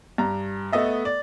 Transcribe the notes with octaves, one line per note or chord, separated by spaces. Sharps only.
G2 A#5
A3 B3 D#5 E5
D5